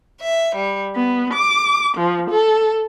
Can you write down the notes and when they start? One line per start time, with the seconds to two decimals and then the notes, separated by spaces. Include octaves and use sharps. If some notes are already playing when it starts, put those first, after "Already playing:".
0.21 E5
0.56 G3
0.95 B3
1.34 D6
1.96 F3
2.29 A4